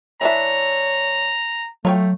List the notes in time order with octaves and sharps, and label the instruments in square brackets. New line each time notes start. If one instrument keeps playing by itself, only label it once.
[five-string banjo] E3 D4 E5 [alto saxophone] C#5 [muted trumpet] A#5
[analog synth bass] F#3 [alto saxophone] A3 [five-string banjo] F4 C#5 G5